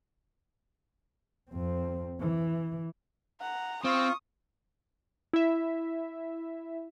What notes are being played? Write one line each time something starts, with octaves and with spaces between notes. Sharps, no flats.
F2 C4
E3
F#5 A#5
C4 F4 C#6 D#6
E4 E5